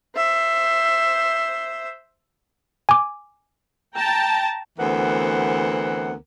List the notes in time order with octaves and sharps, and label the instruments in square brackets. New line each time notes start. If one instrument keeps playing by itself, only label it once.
[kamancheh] C5 E5
[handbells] G#5 D6
[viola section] G5 A5 A#5
[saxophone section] D2 E3 B3 C4 A#4 F#5